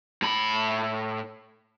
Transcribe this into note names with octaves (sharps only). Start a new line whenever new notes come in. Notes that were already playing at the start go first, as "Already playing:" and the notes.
A2 B5